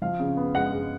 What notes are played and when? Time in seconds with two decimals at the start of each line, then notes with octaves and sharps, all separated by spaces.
0.02 F3 F5
0.20 C#3
0.37 B3
0.54 G#3 F#5
0.72 G#3